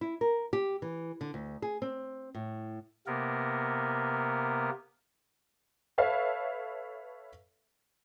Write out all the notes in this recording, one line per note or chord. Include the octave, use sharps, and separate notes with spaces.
E4
A#4
G4
E3
D3
D2
G#4
C4
A2
C3 A#3 B3 A#4
A4 B4 C#5 E5 F5